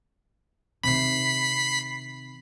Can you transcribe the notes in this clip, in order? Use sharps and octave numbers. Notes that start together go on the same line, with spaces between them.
C3 D#3 B5 B6 C7